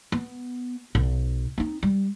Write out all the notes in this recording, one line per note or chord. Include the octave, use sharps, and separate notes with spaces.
B3
B1
C4 D#4
G3